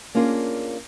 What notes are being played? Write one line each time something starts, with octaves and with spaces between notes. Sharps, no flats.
A#3 C#4 D4 F4 G#4 A#4